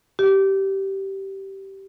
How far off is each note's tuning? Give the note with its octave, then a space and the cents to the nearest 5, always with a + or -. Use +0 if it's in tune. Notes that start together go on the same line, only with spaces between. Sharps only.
G4 -15